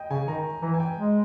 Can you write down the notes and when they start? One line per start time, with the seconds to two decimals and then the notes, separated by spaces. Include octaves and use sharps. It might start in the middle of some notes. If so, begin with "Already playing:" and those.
Already playing: D#5 G5
0.11 C#3 G#5
0.28 D#3 A#5
0.62 E3 A#5
0.74 G#5
0.80 G5
0.97 G#3